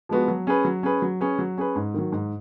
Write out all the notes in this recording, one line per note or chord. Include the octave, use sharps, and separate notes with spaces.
F3 G#3 B3 F#4
F#3
C#4 G#4 B4
F#3
C#4 G#4 B4
F#3
C#4 G#4 B4
F#3
C#4 G#4 B4
G#2
D#3 F#3
G#2